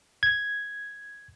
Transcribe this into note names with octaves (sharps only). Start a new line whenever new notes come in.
G#6